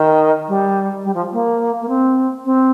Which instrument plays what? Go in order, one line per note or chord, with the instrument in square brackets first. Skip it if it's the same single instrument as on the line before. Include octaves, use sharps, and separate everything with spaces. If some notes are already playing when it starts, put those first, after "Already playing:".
Already playing: [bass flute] D#3
G3
G3
F3
A#3
A#3
C4
C4